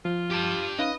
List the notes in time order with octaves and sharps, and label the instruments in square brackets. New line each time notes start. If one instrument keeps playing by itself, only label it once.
[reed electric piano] F3 [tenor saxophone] F4
[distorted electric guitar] G4 A5
[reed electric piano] C#4 D#4 F5 [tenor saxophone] B4 [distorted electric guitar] D#5